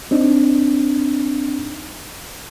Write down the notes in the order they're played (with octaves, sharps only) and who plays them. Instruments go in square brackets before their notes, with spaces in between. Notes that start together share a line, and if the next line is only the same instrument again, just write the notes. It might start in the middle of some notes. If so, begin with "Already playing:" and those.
[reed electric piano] C4 D4 D#4